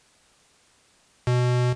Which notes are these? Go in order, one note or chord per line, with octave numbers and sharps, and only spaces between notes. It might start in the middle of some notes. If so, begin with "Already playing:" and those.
B2